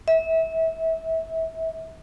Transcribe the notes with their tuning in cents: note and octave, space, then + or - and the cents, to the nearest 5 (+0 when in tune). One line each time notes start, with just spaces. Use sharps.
E5 -25